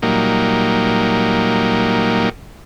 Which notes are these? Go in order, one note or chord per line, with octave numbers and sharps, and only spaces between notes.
A#2 F#3 G3 A#3 D#4